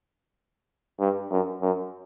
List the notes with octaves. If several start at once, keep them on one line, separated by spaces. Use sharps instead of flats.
G2
F#2
F#2